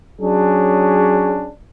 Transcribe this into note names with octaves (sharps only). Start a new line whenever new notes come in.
F#3 C#4 D4 G#4